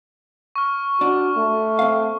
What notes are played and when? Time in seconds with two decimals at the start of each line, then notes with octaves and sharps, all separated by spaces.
0.56 C#6 F6
1.01 D4 F#4
1.36 A3
1.79 C4 F5